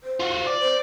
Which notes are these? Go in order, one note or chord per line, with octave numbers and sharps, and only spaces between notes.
C5
F4 F#4
D5
C5